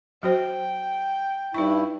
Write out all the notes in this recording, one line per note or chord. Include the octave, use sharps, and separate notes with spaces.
F#3 F#4 C5 G5
G2 D#4 E4 C#6